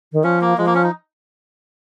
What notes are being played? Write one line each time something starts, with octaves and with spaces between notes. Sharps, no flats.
D#3
F3 C#4
A#3
F3 G#3
A#3
C#4
D#4